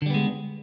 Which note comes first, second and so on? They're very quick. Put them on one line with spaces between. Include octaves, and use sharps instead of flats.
D3 G3 B3 G#3